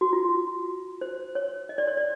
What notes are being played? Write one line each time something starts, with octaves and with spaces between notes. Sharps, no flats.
F#4
F4
F#4
C5
C#5
D#5
D5
C#5
D5